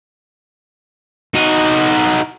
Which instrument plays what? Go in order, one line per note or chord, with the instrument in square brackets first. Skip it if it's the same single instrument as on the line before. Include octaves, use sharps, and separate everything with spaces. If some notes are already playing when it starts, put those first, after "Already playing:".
[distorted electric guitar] D#4 F#4